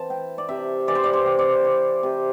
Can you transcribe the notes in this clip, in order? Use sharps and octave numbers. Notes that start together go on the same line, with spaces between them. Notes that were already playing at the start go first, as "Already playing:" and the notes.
Already playing: E3 C4 A5
E4 G5
D5
C3 E5
E3 D5
C5
D5
C5
C4
D5
E4
C3